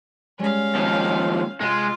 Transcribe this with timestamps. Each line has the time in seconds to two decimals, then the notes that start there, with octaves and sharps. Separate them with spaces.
0.39 G3 G#3 C#4 F5
0.75 D#2 F3
1.61 C3 G#3 F4